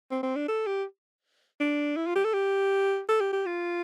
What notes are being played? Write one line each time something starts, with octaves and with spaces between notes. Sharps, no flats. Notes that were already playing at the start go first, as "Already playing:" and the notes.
C4
C4
D4
A4
G4
D4
E4
F4
G4
A4
G4
A4
G4
G4
F4